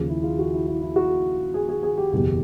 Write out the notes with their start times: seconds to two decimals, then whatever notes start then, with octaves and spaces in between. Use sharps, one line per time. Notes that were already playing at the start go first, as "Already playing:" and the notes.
Already playing: D#2 C#3 F3 G#4
0.09 E4
0.23 F4
0.39 F#4
0.53 E4
0.67 E4
0.81 E4
0.96 F#4
1.54 G#4
1.69 G#4
1.83 G#4
1.98 G4
2.12 F#1 E2 B2 G4